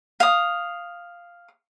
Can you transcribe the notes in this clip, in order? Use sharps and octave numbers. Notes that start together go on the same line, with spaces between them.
F5 D#6